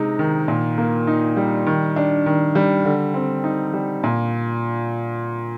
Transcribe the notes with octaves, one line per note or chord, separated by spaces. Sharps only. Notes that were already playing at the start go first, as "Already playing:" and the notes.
Already playing: C3 G#3 D#4
D#3
A#2
A#3
D#4
G3
D#3
D4
D#3
G3
D3
C4
D#4
G3
A#2